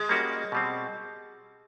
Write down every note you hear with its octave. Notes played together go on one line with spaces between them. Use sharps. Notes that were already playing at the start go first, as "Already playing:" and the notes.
Already playing: G#3
G3 A#3 C#4 F#4 A#4
B2 G3 C4